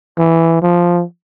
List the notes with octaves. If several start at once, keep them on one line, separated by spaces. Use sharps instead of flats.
E3
F3